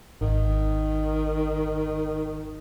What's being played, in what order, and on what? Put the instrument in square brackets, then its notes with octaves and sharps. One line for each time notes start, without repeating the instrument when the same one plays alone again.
[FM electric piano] G#1 [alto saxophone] D#3